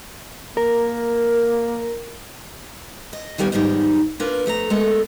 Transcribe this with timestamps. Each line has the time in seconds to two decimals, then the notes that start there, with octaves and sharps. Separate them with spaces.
0.57 A#3 A#4
3.13 D#5
3.38 D3 D#3 G3 A#3 B3 C#4
3.52 E2 G#2 D#3 F3 G3 D#4
4.20 A#3 D4 F4 A#4 B4
4.46 F2 A3 F4 A#5
4.70 G#3 A3 B3 F#4 A4 A#4